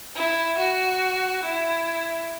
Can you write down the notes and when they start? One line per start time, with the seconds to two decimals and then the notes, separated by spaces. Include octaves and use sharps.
0.15 E4
0.58 F#4
1.43 E4